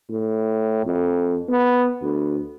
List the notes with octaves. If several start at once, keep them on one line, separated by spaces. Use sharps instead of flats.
A2
F2
B3
D2